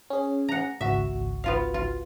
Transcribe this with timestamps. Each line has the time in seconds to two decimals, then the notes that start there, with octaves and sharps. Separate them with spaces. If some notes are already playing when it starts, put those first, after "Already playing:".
0.10 C#4 G#4
0.49 F#5 A#5
0.81 G#1 C#2 F#4 E5
1.44 B3 F4 F5
1.74 F4